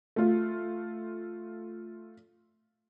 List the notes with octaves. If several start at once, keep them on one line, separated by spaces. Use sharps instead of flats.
A3 F4